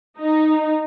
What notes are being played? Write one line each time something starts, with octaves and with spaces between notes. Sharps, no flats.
D#4